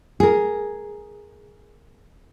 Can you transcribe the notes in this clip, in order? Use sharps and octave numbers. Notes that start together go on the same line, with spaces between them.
G#4 A#4